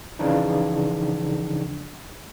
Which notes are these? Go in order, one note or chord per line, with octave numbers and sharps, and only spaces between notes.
C#3 E3 F3 D4 D#4